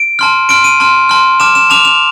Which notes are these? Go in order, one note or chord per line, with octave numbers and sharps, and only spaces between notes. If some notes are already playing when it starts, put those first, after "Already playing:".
Already playing: D7
A5 C6 F6
A5 C6 F6 D7
D#7
A5 C6 F6
A5 C6 F6
A5 D6 F6 E7
E7
A5 D6 F6 F7
F7